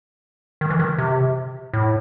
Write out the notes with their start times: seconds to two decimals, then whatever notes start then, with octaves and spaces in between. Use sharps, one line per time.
0.61 D#3
0.70 E3
0.79 D#3
0.98 C3
1.73 A2